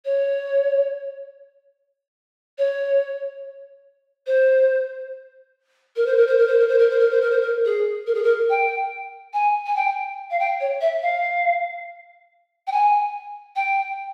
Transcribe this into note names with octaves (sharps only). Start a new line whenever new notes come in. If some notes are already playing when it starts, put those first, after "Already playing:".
C#5
C#5
C5
A#4
C5
A#4
C5
A#4
C5
A#4
C5
A#4
C5
A#4
C5
A#4
C5
A#4
G#4
A#4
G#4
A#4
G5
G#5
G#5
G5
F5
G5
C#5
E5
F5
G5
G#5
G5